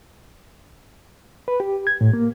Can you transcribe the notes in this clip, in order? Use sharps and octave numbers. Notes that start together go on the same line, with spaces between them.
B4
G4
G#6
A2
A#3